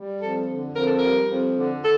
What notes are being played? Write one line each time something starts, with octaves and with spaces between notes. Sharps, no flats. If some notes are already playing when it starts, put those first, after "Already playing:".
Already playing: G3
F2 A4
D3
F2 A#4
A4
G3 A#4
F2
D3
A4